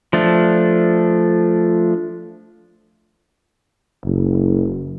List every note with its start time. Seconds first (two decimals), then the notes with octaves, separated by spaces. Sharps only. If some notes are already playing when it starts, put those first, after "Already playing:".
0.13 F3 A3 D4
4.04 F#1